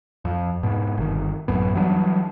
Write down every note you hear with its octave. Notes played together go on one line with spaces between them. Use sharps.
F2
G#2 B2
G1 D#3
A1 F#2 B3
E3 F#3 G3 D4